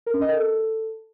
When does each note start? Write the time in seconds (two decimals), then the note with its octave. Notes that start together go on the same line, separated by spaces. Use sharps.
0.06 A#4
0.14 C#4
0.21 D#5
0.28 A#4
0.36 A4